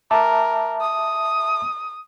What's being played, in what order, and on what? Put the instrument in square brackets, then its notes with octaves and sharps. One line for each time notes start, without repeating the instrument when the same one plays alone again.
[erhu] A#4 [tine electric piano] E5 A5 D6
[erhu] D#6